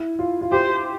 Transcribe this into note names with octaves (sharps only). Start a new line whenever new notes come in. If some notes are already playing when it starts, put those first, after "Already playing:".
Already playing: E4
F4
F4
G4 C5